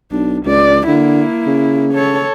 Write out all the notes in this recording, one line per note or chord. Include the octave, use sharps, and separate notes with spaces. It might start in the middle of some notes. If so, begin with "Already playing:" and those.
B1 D4
C#2 D5
D3 A#3 E4
C#3
A4 C#5